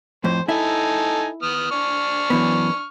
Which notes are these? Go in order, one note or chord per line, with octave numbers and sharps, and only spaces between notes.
F2 A2 C5
D#4 E4 A4 E5 G#5
B3 D#6 F6
D4 C#6 F6
F#2 E3 B3